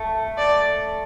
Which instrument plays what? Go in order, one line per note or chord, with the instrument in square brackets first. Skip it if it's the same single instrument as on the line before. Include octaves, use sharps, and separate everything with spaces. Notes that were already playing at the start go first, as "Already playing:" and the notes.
Already playing: [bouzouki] A3
[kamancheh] D5